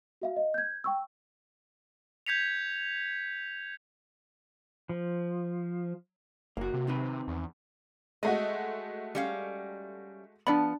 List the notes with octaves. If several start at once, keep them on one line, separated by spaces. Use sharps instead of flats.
F#4 E5 F5
D#5
G6 G#6
G5 C#6 E6
G6 G#6 B6 C#7 F7
F3
F#1 A#3 F#4
C3
D#3 C4 B4
E2
G#3 A3 F#4 D#5
G3 C#4 F5
F3 B3 D4 D5 B5